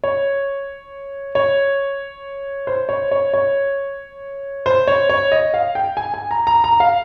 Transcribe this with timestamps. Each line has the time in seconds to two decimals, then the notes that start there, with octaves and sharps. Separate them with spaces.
0.04 C#5
1.35 C#5
2.67 C5
2.89 C#5
3.11 C#5
3.34 C#5
4.66 C5
4.87 C#5
5.09 C#5
5.32 D#5
5.54 F5
5.75 G5
5.97 G#5
6.14 G#5
6.31 A#5
6.47 A#5
6.64 A#5
6.80 F5